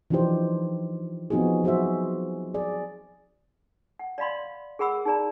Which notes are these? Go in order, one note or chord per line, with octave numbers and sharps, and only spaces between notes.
E3 F3 D4 D#4 G4 C5
F3 B3 C4 D#4 F#4 G#4
F#3 F#4 G#4 C5 E5
G#4 D5
F#5
D5 D#5 F5 B5 C6
G#4 A#4 F#5 B5 E6
D#4 G#4 D5 A#5